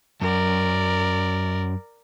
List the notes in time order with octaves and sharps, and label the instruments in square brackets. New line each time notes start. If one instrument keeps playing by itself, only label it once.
[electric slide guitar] F#2 [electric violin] A#4 D5